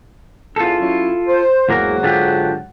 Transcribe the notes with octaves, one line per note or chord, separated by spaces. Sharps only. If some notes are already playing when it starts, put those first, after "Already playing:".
E2 D4 F4 A4
F#3 C#4 E4
C5
E2 G#2 F#3 A#3 A#4 F#5
D3 F4 G4